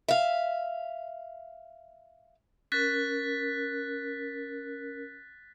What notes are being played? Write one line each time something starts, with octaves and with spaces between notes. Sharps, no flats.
E5 F5
C#4 A#4 F#6 A6 B6